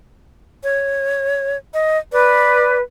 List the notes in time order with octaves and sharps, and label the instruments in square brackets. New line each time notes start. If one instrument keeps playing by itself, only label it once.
[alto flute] C#5
D#5
[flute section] B4 [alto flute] D5